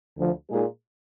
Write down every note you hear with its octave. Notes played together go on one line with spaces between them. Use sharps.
D2 D3 F3
A#2 G#3 D#4 G#4